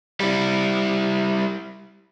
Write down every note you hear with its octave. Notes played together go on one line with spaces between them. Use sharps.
G3 E4